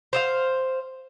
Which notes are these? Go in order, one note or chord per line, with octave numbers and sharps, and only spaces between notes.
C5 D#5 F5